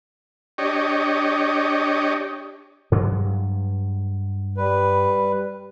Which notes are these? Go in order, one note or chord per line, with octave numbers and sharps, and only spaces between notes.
D4 G4 C#5 D#5
G2 F#3 G#3
G3 B4